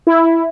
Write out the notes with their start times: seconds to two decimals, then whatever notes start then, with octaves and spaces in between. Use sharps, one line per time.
0.07 E4